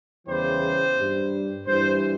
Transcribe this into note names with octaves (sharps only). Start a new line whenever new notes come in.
E2 C#3 E3 G3 C5
G2 G3
G2 E3 G3 C5